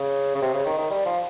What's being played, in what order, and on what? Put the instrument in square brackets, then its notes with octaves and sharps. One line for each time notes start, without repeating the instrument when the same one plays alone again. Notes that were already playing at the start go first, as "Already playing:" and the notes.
Already playing: [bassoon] C#3
C#3
C3
C#3
D#3
D#3
G3
F3